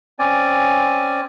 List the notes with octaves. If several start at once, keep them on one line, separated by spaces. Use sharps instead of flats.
C4 C#4 D5 G#5